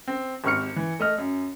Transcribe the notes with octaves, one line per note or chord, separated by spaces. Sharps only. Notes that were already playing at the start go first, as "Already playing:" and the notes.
C4
G#1 C3 C#6 F6 C#7
E3
A3 D#5 F6
F#2